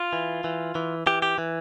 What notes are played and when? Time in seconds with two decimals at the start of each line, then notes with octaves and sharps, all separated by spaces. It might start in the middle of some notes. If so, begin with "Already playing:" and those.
Already playing: F4
0.13 E3
0.44 E3
0.75 E3
1.07 E3 G4
1.22 G4
1.38 E3